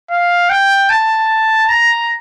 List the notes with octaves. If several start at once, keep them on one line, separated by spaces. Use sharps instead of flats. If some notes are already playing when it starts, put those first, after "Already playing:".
F5
G5
A5
A#5